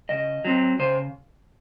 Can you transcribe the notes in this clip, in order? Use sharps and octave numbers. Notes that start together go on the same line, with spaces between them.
C#3 D#5
F#3 C4
C#3 C5